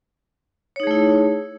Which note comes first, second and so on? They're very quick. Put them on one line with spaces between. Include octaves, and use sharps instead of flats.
C#5 D#4 G#4 A3 E4